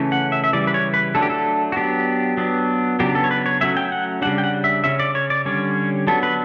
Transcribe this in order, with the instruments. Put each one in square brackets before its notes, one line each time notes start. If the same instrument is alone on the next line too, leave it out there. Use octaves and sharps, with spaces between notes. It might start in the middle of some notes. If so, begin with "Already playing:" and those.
Already playing: [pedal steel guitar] C#3 E3 A3 C#4
F#5
E5
E5
C#3 E3 G3 D5
B4
C#5
B4
F#3 A3 D4 A4
G4
A4
F#4
F#3 B3 D4 G4
F#3 B3 D4
C#3 F#3 B3 D4 G4
A4
C#5
B4
C#5
F#3 A3 C#4 E5
G5
F#5
C#3 G3 D4 F#5
G5
F#5
E5
C#3 G3 C#4 E5
D5
C#5
D5
D3 G3 C#4 C#5
F#3 B3 D4 A4
B4